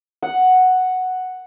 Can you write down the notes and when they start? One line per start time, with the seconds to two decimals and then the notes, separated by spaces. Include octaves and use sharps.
0.23 F#5